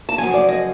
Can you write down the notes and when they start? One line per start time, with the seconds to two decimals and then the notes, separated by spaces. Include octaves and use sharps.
0.09 A5
0.18 F#2 C#3 F3 G#5
0.34 D5
0.49 D#5